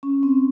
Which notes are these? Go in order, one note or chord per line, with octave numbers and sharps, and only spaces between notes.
C#4
C4